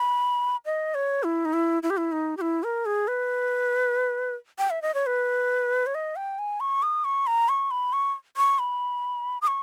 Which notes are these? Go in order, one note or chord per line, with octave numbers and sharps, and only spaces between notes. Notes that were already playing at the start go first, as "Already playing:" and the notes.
Already playing: B5
D#5
C#5
E4
D#4
E4
E4
G4
E4
D#4
G4
E4
A#4
G#4
B4
G5
E5
D#5
C#5
B4
C#5
D#5
G5
G#5
C#6
D#6
C#6
A#5
C#6
B5
C#6
C#6
B5
D#6
C#6